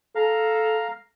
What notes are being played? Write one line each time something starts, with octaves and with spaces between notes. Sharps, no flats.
A4 F5 A#5 F6